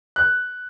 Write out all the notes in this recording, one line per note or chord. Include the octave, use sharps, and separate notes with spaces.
F#6